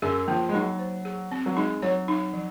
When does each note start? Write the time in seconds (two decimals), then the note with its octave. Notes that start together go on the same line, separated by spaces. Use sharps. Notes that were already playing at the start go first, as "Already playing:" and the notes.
0.02 F#2 G#4
0.28 F3 A#3
0.49 G#3
0.54 F#3 D#4
0.79 C5
1.05 G#4
1.32 C4
1.46 F#3
1.56 G#3 D#4
1.82 F#3 C#5
2.08 D#4
2.33 F3